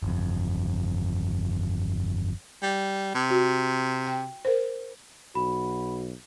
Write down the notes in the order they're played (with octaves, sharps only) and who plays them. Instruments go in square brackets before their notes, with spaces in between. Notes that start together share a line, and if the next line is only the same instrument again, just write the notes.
[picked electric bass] G1 F2
[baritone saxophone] G3
C3
[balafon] F#4
G5
A#4 C5
[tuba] B1 [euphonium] F#4 [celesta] B5